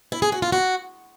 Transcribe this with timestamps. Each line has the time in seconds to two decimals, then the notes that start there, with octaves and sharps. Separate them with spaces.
0.12 E4
0.22 G#4
0.32 F#4
0.42 F4
0.52 F#4